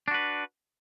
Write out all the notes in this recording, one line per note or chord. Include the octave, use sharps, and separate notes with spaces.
D4 F#4 B4